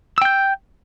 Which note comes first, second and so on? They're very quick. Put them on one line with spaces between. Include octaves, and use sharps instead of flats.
E6 G5 G6